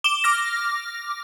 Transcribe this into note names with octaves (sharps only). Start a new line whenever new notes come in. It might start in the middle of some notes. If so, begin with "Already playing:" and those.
D6 E7 G7
D6 F6 A#6